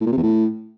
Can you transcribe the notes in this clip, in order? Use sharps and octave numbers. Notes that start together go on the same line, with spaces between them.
A2
A#2
C3
E2
A2